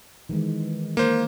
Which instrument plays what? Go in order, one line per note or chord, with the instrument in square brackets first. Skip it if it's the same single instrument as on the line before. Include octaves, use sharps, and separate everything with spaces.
[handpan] D#3 E3 G#3
[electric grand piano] A#3 C5 [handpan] A#4